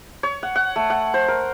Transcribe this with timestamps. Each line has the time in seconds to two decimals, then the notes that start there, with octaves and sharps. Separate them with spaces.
0.23 C#5
0.43 F#5
0.56 F#5
0.76 A3
0.90 F#5
1.14 C5
1.28 A#4